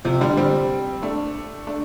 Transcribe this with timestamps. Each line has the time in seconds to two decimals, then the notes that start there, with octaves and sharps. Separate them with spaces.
0.05 C3 F3
0.21 D3 G3
0.37 G3 C4
1.02 A3 D4
1.67 A3 D4